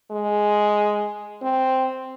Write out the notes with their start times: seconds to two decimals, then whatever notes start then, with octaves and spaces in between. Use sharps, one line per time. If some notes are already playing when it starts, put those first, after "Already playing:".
0.11 G#3
1.42 C4